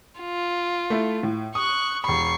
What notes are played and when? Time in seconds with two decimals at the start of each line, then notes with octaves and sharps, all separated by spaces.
0.21 F4
0.90 A3 E4
1.23 A2
1.55 C#6 D#6 F#6
2.04 E1 B5 C#6 C7